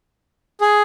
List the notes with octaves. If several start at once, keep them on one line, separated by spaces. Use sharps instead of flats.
G#4